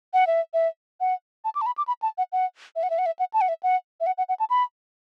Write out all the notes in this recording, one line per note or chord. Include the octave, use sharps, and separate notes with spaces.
F#5
E5
E5
F#5
A5
D6
A5
B5
D6
B5
A5
F#5
F#5
E5
F#5
E5
F#5
E5
F#5
A5
F#5
E5
F#5
E5
F#5
F#5
F#5
A5
B5